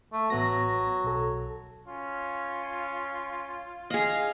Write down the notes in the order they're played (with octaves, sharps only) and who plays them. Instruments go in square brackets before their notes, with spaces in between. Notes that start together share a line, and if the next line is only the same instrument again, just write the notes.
[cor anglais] A3
[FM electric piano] A1 B3 A#6 [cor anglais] F#3
[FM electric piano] B1 A4
[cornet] C#4 [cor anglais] F4
[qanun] G#4 D#5 [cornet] F5